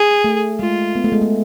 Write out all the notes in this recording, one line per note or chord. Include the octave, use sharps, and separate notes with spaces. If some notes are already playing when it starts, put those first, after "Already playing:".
Already playing: G#4
A3
G#3 F4
B3
A3
G#3
A3